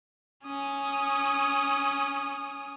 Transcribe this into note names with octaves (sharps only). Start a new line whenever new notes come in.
C#4 D#6